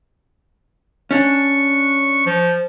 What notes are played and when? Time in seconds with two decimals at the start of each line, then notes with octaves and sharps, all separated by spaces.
1.11 C#4 D4 C#6
2.26 F3